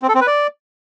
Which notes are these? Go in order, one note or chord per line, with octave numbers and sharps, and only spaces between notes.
C4
A4
C4
B4
D5